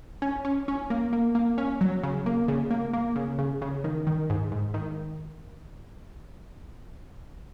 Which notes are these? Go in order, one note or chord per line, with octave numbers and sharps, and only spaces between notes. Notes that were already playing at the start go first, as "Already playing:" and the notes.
C#4
C#4
C#4
A#3
A#3
A#3
C#4
F#3
C#3
A#3
C#3
A#3
A#3
C#3
C#3
C#3
D#3
D#3
G#2
G#2
D#3